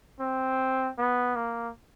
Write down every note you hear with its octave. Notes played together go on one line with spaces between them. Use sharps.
C4
B3
A#3